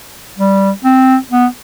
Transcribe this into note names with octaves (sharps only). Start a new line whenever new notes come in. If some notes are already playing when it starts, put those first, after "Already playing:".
G3
C4
B3